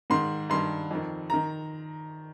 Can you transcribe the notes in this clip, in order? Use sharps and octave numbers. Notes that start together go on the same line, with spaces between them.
G#2 D#3 C6
G2 D#3 C6
F2 D#3
D#3 A#5